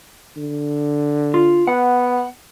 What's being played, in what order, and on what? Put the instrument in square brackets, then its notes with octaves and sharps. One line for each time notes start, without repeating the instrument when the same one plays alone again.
[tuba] D3
[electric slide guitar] F4
[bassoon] B3 [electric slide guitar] F#5